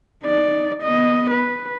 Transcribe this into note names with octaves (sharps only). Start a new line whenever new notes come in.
D#4 D5
B3 D#5
B4